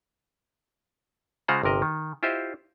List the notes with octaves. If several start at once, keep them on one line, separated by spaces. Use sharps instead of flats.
C#3 G#3 F4 C5 F#5 A#5
G1 C3 A#4 D#5
D#3
E4 F4 G4 C5 D#5 E5